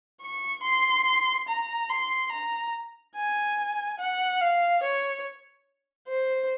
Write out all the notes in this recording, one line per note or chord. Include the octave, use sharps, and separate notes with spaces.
C#6
C6
A#5
C6
A#5
G#5
F#5
F5
C#5
C5